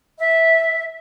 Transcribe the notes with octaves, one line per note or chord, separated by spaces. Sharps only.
E5